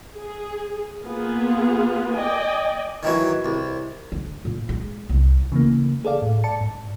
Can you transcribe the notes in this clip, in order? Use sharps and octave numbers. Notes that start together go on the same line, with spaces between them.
G#4
A#3 B3 F4 G#4
D5 D#5 G5 G#5
D#3 E3 F#3
C2
D3
A#2
G#3
C2
C#3 E3 A3 A#3
G#4 A4 D5 F5
A2
D5 A5 C#7
G#2